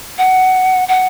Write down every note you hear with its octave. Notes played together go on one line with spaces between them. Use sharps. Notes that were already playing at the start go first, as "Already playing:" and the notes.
F#5
F#5